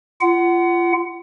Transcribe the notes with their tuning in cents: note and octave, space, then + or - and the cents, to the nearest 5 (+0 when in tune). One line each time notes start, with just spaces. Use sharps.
F4 -25 F#5 +20